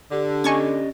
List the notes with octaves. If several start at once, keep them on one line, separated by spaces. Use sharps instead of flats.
D3 G4
C#4 D5 D#5 G#5 C#6 G#6